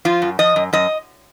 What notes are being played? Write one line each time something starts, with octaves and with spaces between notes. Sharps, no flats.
F3 F4
F#2
F3 D#5
F#2
F#2 D#5